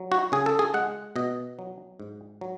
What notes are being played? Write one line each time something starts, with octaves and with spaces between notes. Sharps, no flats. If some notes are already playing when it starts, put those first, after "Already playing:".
Already playing: F#3
F#4
C#3 G#4
A4
G#4
G#3 F#5
B2 D#5
F#3
G#2
F#3